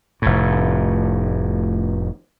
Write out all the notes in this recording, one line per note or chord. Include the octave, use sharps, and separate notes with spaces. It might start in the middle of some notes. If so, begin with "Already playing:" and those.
F1 A2